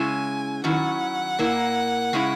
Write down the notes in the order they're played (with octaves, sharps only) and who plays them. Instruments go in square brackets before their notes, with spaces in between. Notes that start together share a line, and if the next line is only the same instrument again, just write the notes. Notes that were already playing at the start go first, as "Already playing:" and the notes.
Already playing: [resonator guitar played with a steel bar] C#3 G#3 C#4 E4 [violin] G#5
[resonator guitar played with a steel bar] D#3 F#3 C#4 E4 [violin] F#5
[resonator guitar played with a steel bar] A#2 A#3 E4
C#3 G#3 C#4 E4